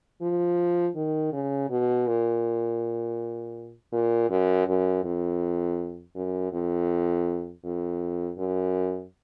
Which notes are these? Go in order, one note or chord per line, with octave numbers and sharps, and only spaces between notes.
F3
D#3
C#3
B2
A#2
A#2
F#2
F#2
F2
F#2
F2
F2
F#2